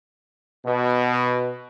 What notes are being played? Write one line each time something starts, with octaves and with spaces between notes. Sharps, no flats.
B2